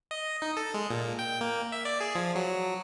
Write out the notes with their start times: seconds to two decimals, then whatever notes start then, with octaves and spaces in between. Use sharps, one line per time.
0.11 D#5
0.42 D#4
0.57 A4
0.74 G#3
0.90 A#2
1.19 G5
1.41 A#3
1.72 E5
1.85 D5
2.00 G#4
2.15 F3
2.36 F#3